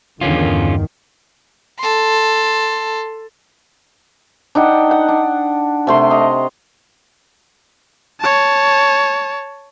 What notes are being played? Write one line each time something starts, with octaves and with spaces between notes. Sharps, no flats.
E2 G2 D3 D#3 C#4 F4
A4 C6
D4 D#4 F#5 G5
F#5
D4
C3 A3 C6
D#5 A#5 D6
C#5 A5